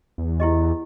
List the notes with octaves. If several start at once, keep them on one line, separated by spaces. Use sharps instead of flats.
E2
E4 G4 D#5